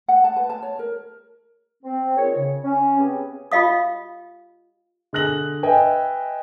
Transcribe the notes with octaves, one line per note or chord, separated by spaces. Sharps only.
F#5
A5
B4
A5
C#5
A#4
C4
A#2 D#3 G#4 C#5
C#3
C#4
C#3 B3 C4 G4 G#4 G#5
F4 G4 D#5 F5 D#6
D3 G#4 F#6 A#6 F#7
B4 D#5 E5 G5 G#5